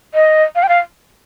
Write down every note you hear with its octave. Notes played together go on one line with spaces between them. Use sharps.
D#5
F5
G5
F5